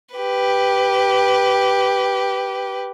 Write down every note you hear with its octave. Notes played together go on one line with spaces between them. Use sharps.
G4 B4